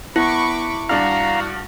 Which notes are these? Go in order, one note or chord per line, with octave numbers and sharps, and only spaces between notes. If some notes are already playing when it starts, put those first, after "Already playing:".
B3 E4 B5 C#6 D6
G2 D4 F#4 F5 A#5 F6